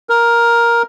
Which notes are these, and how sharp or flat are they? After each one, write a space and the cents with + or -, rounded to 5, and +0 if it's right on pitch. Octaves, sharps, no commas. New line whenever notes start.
A#4 +5